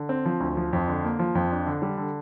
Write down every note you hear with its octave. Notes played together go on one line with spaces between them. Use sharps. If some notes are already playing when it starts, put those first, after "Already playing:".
Already playing: D3
C4
F3
D2
F3
F2
D3
A#3
F3
F2
D4
D3
G3
D3